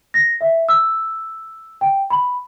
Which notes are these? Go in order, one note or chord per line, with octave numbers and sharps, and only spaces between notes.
A#6
E5
E6
G5
B5